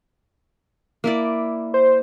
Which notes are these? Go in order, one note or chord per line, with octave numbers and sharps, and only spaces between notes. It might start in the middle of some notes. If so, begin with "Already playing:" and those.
A#3 E4 D5
C5